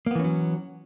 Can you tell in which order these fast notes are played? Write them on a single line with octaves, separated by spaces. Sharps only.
A#3 B3 E3 C#4 F#3